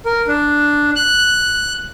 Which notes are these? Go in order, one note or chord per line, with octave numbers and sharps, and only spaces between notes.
A#4
D4
F#6